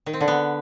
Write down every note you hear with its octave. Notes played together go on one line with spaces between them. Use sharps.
D#3
C4
D3
B3